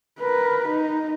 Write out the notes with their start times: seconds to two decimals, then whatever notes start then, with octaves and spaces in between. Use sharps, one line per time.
0.20 A#4 B4
0.69 D#4